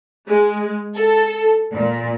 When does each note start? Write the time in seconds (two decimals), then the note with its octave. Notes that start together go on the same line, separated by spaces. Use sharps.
0.27 G#3
0.96 A4
1.73 A#2